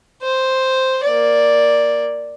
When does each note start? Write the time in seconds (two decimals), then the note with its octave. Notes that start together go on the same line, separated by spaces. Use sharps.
0.22 C5
1.04 A#3 D5